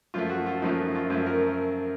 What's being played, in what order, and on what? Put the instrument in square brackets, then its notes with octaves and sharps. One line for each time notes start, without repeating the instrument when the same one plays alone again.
[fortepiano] F#2 F3 A3 F4
F#4
F4
F#2 F3 A3 D#4
F4
F#2 F3 A3 F4
A#4